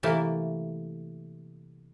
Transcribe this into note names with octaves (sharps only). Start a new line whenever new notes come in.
C3 E3 A3 A#3